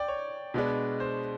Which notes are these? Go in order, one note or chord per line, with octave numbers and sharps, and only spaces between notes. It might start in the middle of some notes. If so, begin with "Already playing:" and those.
Already playing: D5 G5
C#5
B2 G#3 B3 D4
C5